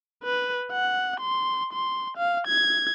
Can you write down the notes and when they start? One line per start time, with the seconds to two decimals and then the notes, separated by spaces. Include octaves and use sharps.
0.24 B4
0.72 F#5
1.20 C6
1.73 C6
2.17 F5
2.47 G#6